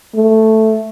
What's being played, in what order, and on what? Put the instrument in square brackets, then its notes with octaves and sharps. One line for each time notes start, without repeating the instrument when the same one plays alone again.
[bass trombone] A3